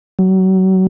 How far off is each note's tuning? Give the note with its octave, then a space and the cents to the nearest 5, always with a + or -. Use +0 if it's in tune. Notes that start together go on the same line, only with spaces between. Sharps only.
F#3 +30